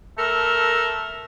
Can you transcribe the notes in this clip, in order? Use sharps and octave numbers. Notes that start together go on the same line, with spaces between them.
A3 A4 A#4